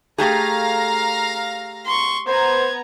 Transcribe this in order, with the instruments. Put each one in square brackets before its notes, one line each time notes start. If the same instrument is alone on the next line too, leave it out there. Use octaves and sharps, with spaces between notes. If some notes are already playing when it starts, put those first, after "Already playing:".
[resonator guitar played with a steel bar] A3 G4 G#4 [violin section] F5 A#5 A#6
[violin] C6 C#6
[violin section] B3 A#5 [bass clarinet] C5 [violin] G#6